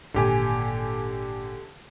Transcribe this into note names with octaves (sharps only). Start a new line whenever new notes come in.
G#1 A#2 D3 G4 G#5